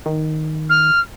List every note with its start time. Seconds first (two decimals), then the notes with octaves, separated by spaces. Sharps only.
0.06 D#3
0.69 F6